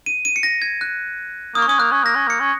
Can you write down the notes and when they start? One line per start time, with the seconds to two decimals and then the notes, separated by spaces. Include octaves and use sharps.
0.06 D#7
0.25 D#7
0.36 C#7
0.43 A#6
0.62 G#6
0.81 F#6
1.55 A#3 D#6
1.62 C#6
1.67 C#4 D#6
1.79 A#3 F#6
1.92 C#4
2.04 A#3 A#6
2.15 C#4
2.27 A#3 C#7
2.40 C#4